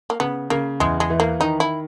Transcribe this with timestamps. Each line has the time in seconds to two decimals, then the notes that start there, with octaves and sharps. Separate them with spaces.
0.10 A#3
0.20 C#3 B3
0.50 C#3 A#3
0.80 E2 G#3
1.00 G#3
1.10 E3
1.20 A#3
1.40 D#3 D#4
1.60 E4